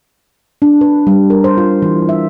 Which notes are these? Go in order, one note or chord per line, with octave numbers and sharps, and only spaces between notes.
D4
B4
G3
A#4
C5
F4
E3
E5